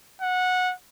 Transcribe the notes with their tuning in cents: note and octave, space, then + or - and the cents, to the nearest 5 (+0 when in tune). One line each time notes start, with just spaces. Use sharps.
F#5 -15